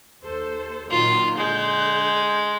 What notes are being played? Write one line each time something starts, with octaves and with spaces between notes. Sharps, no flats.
D#2 A4 C5
A#2 D#3 F#3 F4
D3 G#3 G6